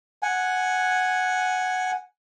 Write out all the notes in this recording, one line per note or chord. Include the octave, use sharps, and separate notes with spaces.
F#5 G#5